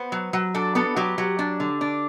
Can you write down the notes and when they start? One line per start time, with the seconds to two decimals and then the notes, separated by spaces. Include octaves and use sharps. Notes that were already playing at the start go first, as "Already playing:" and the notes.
Already playing: B3 C5
0.12 F#3
0.33 F#3
0.55 D4 A4
0.75 B3 A4
0.96 F#3 G4
1.18 F#3
1.39 D4
1.60 D3
1.81 D4